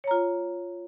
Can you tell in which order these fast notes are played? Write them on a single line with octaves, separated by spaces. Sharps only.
C#5 A#5 F4